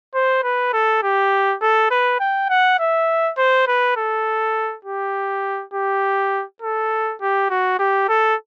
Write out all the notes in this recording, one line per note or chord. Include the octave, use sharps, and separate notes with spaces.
C5
B4
A4
G4
A4
B4
G5
F#5
E5
C5
B4
A4
G4
G4
A4
G4
F#4
G4
A4